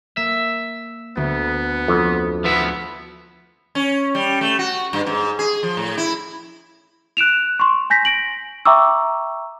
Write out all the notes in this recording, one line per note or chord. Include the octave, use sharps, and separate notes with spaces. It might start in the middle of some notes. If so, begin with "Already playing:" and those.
A#3 E5
D2 B3
F2
F3 B3 E4 B4 E5 F#5 B5
C#4
G3
A3
F#4
G2
G#2
G#4
F3
A2
E4
F#6 D7 E7 F7
C6 C#6
G#5 G6 A#6 B6
A#6 D7 F#7
E5 G5 A#5 C#6 D6 E6